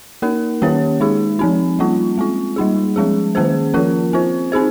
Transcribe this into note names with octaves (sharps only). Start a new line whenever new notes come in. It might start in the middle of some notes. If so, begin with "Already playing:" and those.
A#3 D#4 A#4
D#3 A#3 C#4 G4 C#5
G#3 D#4 G#4
F3 C4 D#4
G3 A#3 C#4 F4
G#3 C4 F4
G3 A#3 D#4 G#4
F3 G#3 C#4 G#4
D#3 A#3 C#4 G#4 C5
F3 A#3 C#4 F4 A#4
C4 F4 C5
C4 D#4 G#4 C5